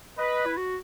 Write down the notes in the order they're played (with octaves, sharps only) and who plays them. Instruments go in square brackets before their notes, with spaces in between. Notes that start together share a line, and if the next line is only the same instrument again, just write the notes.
[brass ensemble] B4 [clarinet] D#5
[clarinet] E4
F#4